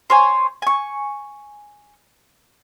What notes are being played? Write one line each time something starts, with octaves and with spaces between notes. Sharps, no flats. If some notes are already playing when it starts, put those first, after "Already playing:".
C5 C#5 G#5
G#5 C#6